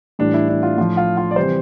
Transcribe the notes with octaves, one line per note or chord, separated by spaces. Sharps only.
A2 E3 G3 D4
E4
D4
F4
A2 F3 F4
F4
F4
D5
C3 E3 G3 C5